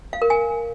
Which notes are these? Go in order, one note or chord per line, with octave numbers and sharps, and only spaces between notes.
F5
A#4
G#5